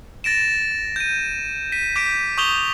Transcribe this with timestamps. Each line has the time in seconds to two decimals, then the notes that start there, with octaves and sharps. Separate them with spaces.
0.24 A6 A#6 D7 E7
0.96 G6 D#7
1.72 B6 D#7
1.96 D6 G6 B6 D7
2.38 C#6 D#6 G6 F7 G7